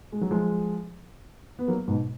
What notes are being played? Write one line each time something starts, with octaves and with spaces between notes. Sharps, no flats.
G#3
F#3
F3 G#3
B3
F#3 A#3
G#2 B2